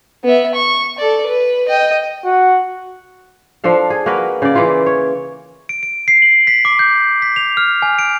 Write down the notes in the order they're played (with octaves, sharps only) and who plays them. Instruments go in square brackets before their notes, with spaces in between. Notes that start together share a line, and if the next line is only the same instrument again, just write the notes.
[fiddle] B3 E5
C#6
A4 D5
B4
D#5 G5
[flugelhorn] F#4
[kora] F3 D4 A4 F5
G#4
A#3 F#4 A#4 B4
C#3 D5
E3 A#3 E4 F4
C#5
[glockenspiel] D7
D7
C7
F#7
B6
D6
G6
B6
F7
F6
G#5
D7